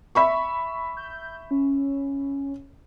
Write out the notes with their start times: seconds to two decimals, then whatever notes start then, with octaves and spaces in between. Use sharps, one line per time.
0.15 E5 B5 C#6
0.97 G6
1.51 C#4